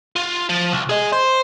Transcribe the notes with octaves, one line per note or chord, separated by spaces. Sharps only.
F4
F3
C2
G#4 D#5
C5